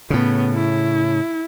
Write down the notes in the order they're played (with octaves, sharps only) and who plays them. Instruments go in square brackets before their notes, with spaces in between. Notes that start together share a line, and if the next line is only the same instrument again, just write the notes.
[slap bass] A2 C#3 [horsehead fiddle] B3
[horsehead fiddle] E4